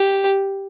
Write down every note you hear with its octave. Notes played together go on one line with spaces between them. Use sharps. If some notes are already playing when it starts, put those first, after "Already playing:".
Already playing: G4